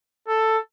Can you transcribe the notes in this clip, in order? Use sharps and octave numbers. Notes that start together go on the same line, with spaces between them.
A4